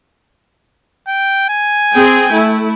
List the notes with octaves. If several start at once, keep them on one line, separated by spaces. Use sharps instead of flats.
G5
G#5
C4 G#4 G5
A3 E4